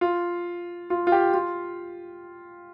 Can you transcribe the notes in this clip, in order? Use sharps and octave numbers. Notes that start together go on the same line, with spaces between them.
F4
F4
F4
G4
F4